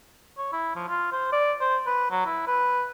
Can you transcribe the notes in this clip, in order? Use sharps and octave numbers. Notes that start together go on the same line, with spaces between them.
C#5
E4
F3
F4
C5
D5
C5
B4
F#3
E4
B4